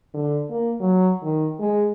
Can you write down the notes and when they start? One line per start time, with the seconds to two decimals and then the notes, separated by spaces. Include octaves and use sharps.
0.14 D3
0.50 A#3
0.80 F#3
1.23 D#3
1.60 G#3